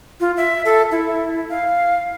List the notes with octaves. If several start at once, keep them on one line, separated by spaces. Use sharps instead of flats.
F4
E5
A4
E4
F5